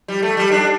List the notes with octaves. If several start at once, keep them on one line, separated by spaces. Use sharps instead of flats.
G3
A3
G3
D4